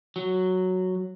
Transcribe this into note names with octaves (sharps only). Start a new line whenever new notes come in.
F#3